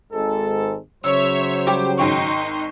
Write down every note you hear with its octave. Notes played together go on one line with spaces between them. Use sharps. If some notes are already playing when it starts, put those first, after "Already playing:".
G#1 G#2 A4
C#3 F#3 C5 C#5 E5 E6
G3 G4 D6
G#1 D#4 G5 C6 C#6